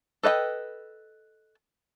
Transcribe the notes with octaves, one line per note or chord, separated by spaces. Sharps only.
A4 B4 D#5 F5 G5